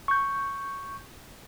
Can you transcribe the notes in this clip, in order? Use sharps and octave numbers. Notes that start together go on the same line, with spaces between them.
C#6 G6